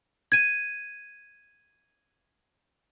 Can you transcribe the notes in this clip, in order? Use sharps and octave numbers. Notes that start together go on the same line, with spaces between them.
G#6 D#7